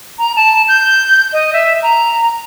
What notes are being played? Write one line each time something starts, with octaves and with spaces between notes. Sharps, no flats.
A#5
A5
G6
D#5
E5
A#5